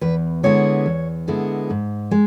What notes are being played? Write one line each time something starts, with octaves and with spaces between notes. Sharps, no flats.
E2 B4
D3 G#3 B3 E4 C#5
E2
D3 G#3 B3 E4
G#2
G#3